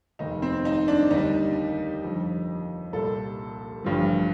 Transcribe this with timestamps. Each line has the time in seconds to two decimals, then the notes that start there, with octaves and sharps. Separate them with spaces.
0.19 F1 D#2 D#3 D#4
0.42 C4
0.65 D#4
0.88 D4
1.11 D#2 D3 G3 D#4
2.02 G1 F2 D3
2.93 C2 A#2 G3 A4
3.84 A1 G2 D3 F3